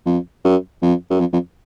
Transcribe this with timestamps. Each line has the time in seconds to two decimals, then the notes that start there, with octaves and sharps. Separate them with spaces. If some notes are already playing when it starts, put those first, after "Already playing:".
0.06 F2
0.45 F#2
0.82 F2
1.10 F#2
1.20 F2
1.33 F2